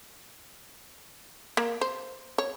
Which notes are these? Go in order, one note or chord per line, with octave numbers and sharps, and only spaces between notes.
A#3
C5
C#5